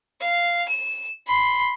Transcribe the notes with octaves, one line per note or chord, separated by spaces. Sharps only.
F5
E7
B5 C6